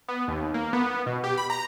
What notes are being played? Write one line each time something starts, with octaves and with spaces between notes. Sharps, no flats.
B3
D#2
A#3
B3
B2
G4
B5
A#5